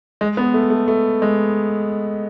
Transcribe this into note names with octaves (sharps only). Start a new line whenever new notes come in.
G#3
B3
A3
A3
A3
G#3